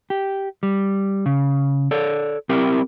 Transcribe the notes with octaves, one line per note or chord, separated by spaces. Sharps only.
G4
G3
C#3
A4 C#5 D5
C4 E4 G4 A#4